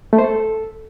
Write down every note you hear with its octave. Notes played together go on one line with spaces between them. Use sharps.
A3
C5
A4